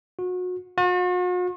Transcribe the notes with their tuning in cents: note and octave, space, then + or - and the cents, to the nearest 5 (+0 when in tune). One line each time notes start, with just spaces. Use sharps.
F#4 -30
F#4 -45